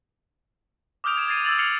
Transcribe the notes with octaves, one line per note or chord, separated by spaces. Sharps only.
D6 D#6 F6 G6 D7 F7
G#6 D7 E7
G#6 A6 C7 D#7
E6 G#6 A6 F#7
F6 G#6 C7 C#7 F7 F#7